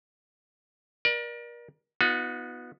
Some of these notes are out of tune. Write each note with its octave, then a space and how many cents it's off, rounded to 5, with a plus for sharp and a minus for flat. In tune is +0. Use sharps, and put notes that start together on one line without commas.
A#4 +35 D5 +25
B3 +0 D#4 +25 F#4 -45